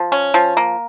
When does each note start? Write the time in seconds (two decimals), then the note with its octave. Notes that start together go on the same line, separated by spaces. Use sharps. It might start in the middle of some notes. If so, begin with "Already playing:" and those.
Already playing: F3
0.12 C#4
0.34 F3
0.57 A#3